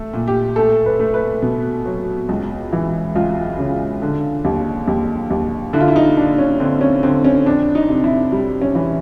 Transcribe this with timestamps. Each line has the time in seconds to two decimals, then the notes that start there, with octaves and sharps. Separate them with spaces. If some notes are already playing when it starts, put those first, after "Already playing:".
Already playing: A3 A4
0.14 A#2
0.28 G4
0.56 A3 A4
0.86 B4
1.00 A3
1.14 B4
1.42 B2
1.86 F#3
2.29 C#2
2.73 E3
3.15 C#2 F4
3.59 C#3
4.02 D3
4.45 D#2
4.87 D#2
5.30 D#2
5.73 D3 E4
5.80 F4
5.88 E4
5.96 D#4
6.17 D3 D4
6.38 C#4
6.60 D3 C4
6.81 C#4
7.03 D3 C4
7.25 C#4
7.46 F2 D4
7.75 D#4
7.89 C3
8.04 E4
8.32 G3
8.62 C#4
8.75 E3